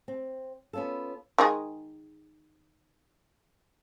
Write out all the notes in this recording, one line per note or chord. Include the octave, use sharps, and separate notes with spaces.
C4
B3 C#4 D4 F4 A4
D#3 G#3 G#4